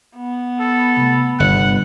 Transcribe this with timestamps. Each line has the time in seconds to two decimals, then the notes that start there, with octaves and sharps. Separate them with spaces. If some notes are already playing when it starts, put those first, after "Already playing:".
0.16 B3
0.60 A4
0.96 C3 A3
1.40 G1 C3 F#5